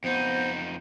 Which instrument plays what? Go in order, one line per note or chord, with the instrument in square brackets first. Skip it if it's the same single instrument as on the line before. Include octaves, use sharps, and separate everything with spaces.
[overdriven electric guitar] F2 D#4 [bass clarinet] B3 [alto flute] C5